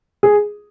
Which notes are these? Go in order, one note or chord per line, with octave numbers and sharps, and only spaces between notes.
G#4